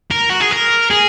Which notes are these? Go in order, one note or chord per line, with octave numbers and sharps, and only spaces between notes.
A#4
F#4
G#4
A#4
G#4